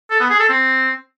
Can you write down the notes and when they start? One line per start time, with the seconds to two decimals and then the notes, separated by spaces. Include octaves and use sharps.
0.11 A4
0.20 B3
0.30 G#4
0.40 A4
0.49 C4